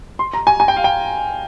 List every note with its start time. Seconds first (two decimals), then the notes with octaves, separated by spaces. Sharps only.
0.19 C6
0.34 A#5
0.47 G#5
0.60 G#5
0.68 G5
0.77 F5
0.84 G5